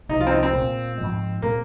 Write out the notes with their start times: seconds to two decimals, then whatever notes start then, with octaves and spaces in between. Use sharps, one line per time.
0.09 C2 C3 F3 D#4
0.21 F4
0.27 C4
0.31 D#4
0.43 C4
0.53 A#2 A#3
0.98 G#2 F3 G#3
1.42 A#2 G#3 A#3 C4